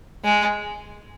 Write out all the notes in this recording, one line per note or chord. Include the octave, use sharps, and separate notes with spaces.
G#3